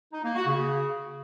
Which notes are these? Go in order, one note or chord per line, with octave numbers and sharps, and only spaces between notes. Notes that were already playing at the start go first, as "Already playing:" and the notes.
D#4
A#3
F#4
C#3